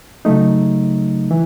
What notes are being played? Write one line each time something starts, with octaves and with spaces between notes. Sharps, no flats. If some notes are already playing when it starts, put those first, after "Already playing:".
C#3 F#3 A3 D#4
E3